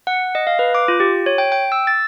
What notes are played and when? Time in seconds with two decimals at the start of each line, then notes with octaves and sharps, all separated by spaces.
0.07 F#5
0.35 D#5
0.47 F5
0.59 B4
0.75 D6
0.88 F4
1.00 G4
1.26 C#5
1.38 G5
1.52 G5
1.72 E6
1.87 A6